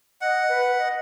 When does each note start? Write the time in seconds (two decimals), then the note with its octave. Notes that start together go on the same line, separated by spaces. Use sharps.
0.21 D#5 F#5
0.49 B4
0.78 D#5